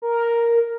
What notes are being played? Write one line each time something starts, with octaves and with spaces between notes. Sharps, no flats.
A#4